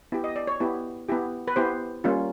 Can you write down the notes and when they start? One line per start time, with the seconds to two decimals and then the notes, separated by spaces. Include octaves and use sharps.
0.12 B3 E4 G4
0.24 D#5
0.36 D5
0.47 C#5
0.60 B3 E4 G4
1.09 B3 E4 G4
1.48 B4
1.56 B3 E4 G4 C5
2.04 G3 A#3 C#4 F4